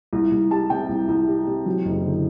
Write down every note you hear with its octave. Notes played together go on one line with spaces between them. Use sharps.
C2
C2
G3 A5
C3 G5
C2
C2
G3
C3
F#3
F#1
D3